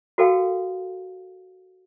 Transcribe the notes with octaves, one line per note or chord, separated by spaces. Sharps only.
F#4 A4 A#4 F5 G5